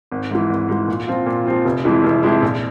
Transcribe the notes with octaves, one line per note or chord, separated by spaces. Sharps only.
G#1
G#2 E3
G#1
G#2 E3
A#2
F3 C4 F4
A#2
F3 C4 F4
F1
F2 E3 G#3 E4
F1
F2 E3 G#3 E4
A#1